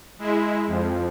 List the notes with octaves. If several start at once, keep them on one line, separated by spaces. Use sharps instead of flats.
G#3 E4
F2